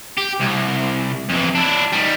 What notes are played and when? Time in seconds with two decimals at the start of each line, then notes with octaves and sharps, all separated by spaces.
0.17 G4
0.40 C2
1.29 F2 E3
1.55 D4 E4
1.92 D#3 G3